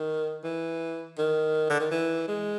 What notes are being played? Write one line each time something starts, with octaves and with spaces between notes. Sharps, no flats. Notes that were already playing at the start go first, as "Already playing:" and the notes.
Already playing: D#3
E3
D#3
D3
D#3
E3
G#3